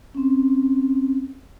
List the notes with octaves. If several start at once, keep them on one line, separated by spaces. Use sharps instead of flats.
C4 C#4